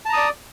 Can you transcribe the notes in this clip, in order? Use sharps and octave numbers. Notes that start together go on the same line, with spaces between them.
D5 A5 A#5 D#6